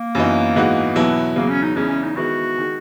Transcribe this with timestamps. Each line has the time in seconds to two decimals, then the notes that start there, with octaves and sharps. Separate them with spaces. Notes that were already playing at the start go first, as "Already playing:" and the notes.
Already playing: A#3
0.15 F#2 E3 B3 D#4
0.56 G#2 E3 B3 D#4 F#4
0.96 E2 B2 F#3 B3 E4
1.36 E2 C#3 F#3 A#3
1.49 C#4
1.62 D#4
1.76 E2 C#3 E3 G#3 C#4
1.89 C#4
2.03 D#4
2.16 D#3 G#3 B3 E4 F#4
2.58 D#3 G#3